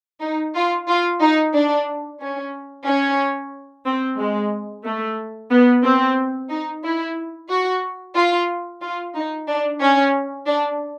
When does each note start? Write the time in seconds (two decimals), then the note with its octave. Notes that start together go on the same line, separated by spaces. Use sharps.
0.21 D#4
0.55 F4
0.88 F4
1.21 D#4
1.53 D4
2.20 C#4
2.86 C#4
3.86 C4
4.18 G#3
4.84 A3
5.51 B3
5.84 C4
6.50 D#4
6.83 E4
7.49 F#4
8.16 F4
8.81 F4
9.15 D#4
9.47 D4
9.80 C#4
10.46 D4